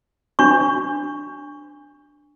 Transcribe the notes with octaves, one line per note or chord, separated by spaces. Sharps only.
D4 C#6